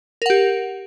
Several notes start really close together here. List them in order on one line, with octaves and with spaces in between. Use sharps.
A#4 F#5 G4